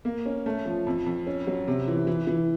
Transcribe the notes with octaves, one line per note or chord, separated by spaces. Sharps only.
A#3
C#4
A3
F3
F2
F2
C#4
F#3
C3
E3
E3
E3